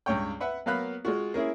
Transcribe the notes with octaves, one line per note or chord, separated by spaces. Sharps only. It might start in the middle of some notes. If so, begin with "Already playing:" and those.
C#2 G2 C#5 G5
B4 E5 F#5
F#3 A#3 B3 F5 B5 F#6
G#3 F4 F#4
A#3 C#4 E4 G#4